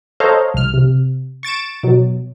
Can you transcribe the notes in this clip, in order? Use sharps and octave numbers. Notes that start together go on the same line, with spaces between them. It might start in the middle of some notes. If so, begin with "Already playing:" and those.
A4 C5 C#5 D#5 F5 A#5
C2 F6
C3
C#6 A6 D7 E7
B2 F#3